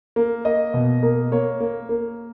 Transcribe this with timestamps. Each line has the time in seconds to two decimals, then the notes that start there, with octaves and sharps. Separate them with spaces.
0.16 A#3
0.45 A#3 D#5
0.74 B2
1.03 A#3
1.32 A#3 C#5
1.60 A#3
1.89 A#3